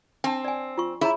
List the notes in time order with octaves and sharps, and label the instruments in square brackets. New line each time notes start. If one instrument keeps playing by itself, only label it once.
[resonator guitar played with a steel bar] C4 [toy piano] D4 A5
[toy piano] D5 G#5
F4 C#6
[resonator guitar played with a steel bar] E4 [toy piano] G#4 C#5 A#5